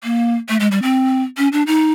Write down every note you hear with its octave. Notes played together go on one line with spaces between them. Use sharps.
A#3
A3
G#3
G3
C4
C#4
D4
D#4